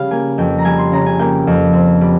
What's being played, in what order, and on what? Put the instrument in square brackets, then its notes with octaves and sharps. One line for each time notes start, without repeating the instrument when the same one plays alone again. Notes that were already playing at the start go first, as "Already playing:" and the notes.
Already playing: [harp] C#3 G3 F5
A#3 G#5
F2 G5
A#5
G3 G#5
C6
C#3 A#5
G#5
A#3 G5
F2
C4
G3